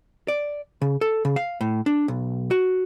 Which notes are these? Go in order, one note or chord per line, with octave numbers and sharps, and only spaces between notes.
D5
C#3
A4
C#3
F5
A2
D4
B1
F#4